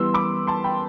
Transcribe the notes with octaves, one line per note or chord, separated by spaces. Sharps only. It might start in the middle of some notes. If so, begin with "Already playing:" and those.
Already playing: E3 G3 B3 C6 E6
B5 D6
A5 C6
G5 B5